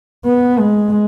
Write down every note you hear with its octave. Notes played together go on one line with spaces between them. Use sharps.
B3
G#3